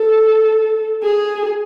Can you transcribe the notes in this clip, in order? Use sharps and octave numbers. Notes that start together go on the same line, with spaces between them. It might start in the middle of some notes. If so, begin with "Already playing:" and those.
Already playing: A4
G#4